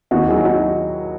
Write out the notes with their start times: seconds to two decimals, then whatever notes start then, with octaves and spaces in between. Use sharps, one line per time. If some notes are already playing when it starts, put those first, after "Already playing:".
0.11 D#2 D#4 F#4
0.28 D#3 F#3 E4 G#4
0.45 D#4 F#4